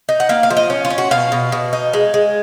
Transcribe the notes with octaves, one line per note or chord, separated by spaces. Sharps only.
D#4
F#5
A#3 F5
F5
F3
D#5
C#4
F4
C#4
F#4
B2 F5
B2
B2
D#4
G#3
G#3